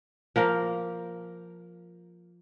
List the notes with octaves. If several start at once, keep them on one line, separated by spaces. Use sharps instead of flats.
F3 A#3 A#4 F5